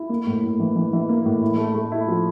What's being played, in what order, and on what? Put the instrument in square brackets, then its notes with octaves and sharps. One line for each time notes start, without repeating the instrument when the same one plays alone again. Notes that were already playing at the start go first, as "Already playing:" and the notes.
Already playing: [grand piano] E4
A#3
A2
A2
E3
E3
E3
A#3
A2
E4
A3
A3
E4
F3